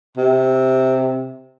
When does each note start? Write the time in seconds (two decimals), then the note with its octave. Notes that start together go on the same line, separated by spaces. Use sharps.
0.17 C3